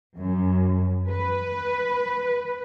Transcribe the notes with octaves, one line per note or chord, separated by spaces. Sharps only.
F#2
B4